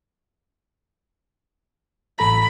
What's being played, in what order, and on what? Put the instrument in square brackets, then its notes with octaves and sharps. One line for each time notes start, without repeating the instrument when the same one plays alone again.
[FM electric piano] A1 A4 A#5 [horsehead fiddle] B5